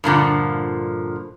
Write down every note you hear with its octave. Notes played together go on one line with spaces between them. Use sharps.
G2 A#2 D3 F3